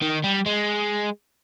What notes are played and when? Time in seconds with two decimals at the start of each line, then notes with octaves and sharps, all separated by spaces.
0.02 D#3
0.24 G3
0.46 G#3